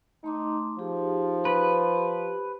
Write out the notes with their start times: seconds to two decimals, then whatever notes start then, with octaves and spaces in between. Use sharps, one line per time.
0.24 A3 D#4 C6 D6
0.79 F3 D#4 G4 G#4
1.45 B4
1.96 G4